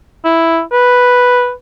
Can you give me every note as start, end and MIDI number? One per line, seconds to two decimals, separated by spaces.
0.25 0.60 64
0.72 1.52 71